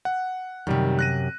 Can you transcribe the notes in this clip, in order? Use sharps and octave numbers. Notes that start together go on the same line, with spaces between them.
F#5
F#2 C3 D#3 G3
F#6 A#6 D#7